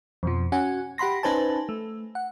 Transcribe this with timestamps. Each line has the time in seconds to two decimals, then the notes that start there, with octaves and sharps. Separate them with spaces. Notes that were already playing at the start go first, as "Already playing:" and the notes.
0.23 F2 B2 F3
0.52 C#4 F#4 F#5 G#5
0.98 G4 F#5 B5 C6 A#6
1.23 C#4 D#4 B4 C5 G#5 A5
1.69 A3
2.15 F#5